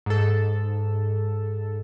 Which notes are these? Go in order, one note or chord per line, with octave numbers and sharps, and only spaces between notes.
G#2 A4